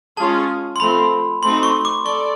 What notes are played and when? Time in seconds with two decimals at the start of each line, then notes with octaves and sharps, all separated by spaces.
0.17 G#3 C#4 F4 G#4 A5
0.76 C6
0.79 F3 A3 C4 B5
1.43 A3 C4 D#4 F#4 C6
1.63 C#6
1.85 D6
2.05 A4 D5 C#6